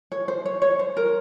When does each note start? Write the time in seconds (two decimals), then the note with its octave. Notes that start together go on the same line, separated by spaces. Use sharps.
0.12 C#5
0.28 C5
0.45 C#5
0.62 C#5
0.79 C5
0.97 A#4